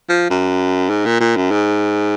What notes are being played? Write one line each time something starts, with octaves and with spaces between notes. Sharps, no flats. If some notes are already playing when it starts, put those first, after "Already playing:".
F3
F#2
G#2
A#2
A#2
F#2
G#2